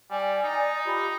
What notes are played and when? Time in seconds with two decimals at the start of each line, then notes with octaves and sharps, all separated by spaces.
0.10 G3 D5 G#5
0.43 D#4
0.85 F4 G4 B5